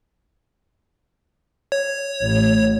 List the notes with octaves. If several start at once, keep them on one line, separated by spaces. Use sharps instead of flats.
C#5
A1